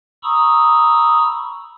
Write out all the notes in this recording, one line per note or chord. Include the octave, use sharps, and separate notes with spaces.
A#5 B5 C#6 D#6 E6